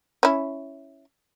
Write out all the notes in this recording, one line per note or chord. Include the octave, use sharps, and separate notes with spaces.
C#4 E4